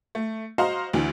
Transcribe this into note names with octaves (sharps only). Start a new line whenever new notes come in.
A3
F#4 C5 D#5 F5 A#5 C6
D2 E3 D4